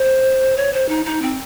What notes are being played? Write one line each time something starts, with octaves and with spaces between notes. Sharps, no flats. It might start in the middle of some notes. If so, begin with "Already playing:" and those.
Already playing: C5
C#5
C5
D#4
D#4
C4